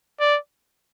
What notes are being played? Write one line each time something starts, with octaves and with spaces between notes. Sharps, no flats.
D5